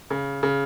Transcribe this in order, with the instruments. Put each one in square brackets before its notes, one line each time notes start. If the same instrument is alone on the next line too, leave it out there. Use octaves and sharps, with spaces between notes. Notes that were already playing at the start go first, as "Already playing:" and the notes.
[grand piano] C#3
C#3